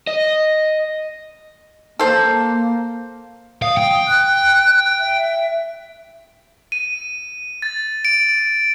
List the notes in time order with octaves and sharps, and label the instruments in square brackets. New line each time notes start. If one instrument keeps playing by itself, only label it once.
[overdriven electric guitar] D#5
[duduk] A#3 [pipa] A4 C5
[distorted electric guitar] F5 [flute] D#6
[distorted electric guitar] G5
[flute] F#6
E5
[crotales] D#7
A6
D7